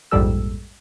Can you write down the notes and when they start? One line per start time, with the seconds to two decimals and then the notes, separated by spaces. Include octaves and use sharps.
0.11 A#1 F2 G#2 G3 A4 E6